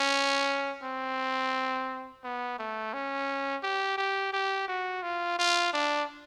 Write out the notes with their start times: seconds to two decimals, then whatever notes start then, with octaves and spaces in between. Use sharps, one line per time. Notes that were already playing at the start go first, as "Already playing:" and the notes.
Already playing: C#4
0.83 C4
2.24 B3
2.59 A3
2.94 C#4
3.63 G4
3.98 G4
4.33 G4
4.68 F#4
5.03 F4
5.39 F4
5.73 D4